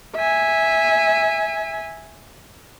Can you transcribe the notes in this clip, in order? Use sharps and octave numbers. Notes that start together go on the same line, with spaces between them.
E5 G#5